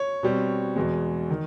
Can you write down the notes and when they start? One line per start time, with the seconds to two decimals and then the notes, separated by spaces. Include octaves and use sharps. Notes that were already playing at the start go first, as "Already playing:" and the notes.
Already playing: C#5
0.23 B2 G3 C4
0.76 E2 B2 G#3
1.30 D#3